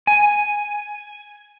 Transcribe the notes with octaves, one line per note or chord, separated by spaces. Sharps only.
G#5